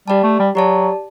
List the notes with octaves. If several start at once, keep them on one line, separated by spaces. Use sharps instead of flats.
G3 G4 D5 A5
A3
G3
F#3 G4 D5 A5